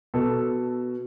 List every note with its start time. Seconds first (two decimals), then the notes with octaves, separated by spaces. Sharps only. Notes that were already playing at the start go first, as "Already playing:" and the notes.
0.14 B2 A4